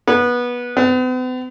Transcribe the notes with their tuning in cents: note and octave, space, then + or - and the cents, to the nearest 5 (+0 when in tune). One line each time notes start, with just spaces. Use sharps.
B3 -20
B3 +45